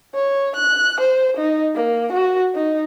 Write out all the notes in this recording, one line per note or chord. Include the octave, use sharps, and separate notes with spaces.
C#5
F#6
C5
D#4
A#3
F#4
D#4